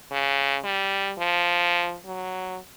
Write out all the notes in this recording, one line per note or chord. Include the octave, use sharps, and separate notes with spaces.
C#3
G3
F3
F#3